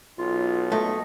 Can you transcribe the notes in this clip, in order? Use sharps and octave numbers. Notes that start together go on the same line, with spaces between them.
B1 F4
A3 D#5